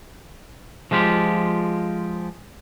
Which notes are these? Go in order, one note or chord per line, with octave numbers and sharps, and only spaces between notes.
F3 G#3 F4 G4